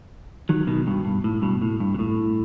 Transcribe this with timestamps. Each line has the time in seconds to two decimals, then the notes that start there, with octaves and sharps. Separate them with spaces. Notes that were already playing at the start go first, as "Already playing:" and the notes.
0.49 D#3 F#3
0.67 B2 D#3
0.87 G2 B2
1.05 G2
1.24 A2
1.42 G2 B2
1.62 A2
1.80 G2
1.94 B2
1.99 A2